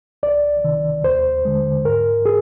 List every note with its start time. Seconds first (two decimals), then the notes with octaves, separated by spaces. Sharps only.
0.23 C2 D5
0.64 C3 D#3
1.04 D#2 C5
1.45 D3 G#3
1.85 G#2 A#4
2.26 G#4